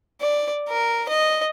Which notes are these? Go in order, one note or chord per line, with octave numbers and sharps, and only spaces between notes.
D5
A#4
D#5